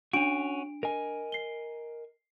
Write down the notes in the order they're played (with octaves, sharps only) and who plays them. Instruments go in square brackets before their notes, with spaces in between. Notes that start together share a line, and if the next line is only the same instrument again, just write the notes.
[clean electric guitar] C#4 F#4 [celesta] D4 D7
[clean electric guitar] A#4 D#5 G#5
[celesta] C7 G7